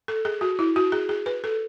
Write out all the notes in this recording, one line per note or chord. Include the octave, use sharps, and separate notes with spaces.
A4
G#4
F#4
E4
F#4
G#4
G#4
B4
A4